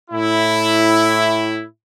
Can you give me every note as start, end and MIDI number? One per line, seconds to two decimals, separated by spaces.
0.11 1.63 45
0.11 1.63 64